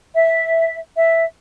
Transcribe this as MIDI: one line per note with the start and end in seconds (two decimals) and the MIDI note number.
0.15 0.77 76
0.95 1.25 76